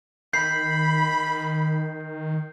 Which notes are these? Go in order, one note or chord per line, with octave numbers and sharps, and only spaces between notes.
D#3 B5 G6 C7